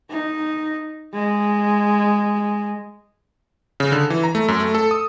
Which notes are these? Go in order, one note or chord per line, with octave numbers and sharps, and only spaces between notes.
D#4
G#3
C#3
D3
E3
A#5
A3
F#2
A3
A4
D#6